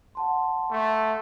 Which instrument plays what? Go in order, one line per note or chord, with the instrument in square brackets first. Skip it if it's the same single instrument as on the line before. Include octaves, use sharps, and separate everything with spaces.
[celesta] F#5 A5 C6
[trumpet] A3